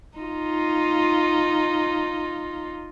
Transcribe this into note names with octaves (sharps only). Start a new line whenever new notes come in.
D#4 F4